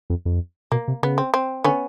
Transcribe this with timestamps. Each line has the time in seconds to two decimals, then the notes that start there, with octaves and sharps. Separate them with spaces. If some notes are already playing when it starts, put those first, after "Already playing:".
0.10 F2
0.26 F2
0.72 B2 A#3
0.88 C3
1.03 C#3 B3
1.18 C4
1.34 C4
1.64 D3 B3 C#4